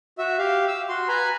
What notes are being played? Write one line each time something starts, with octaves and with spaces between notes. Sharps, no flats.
F#4 E5 E6
G4 F5
E6
F#4 C6
B4 G#5 A#5 B5